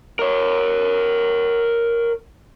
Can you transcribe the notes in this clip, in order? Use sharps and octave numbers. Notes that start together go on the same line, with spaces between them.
A#4 C#5